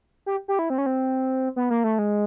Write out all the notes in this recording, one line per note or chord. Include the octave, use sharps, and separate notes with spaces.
G4
G4
E4
C4
C#4
C4
B3
A#3
A3
G#3